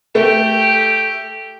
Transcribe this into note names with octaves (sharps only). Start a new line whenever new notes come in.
A3 G4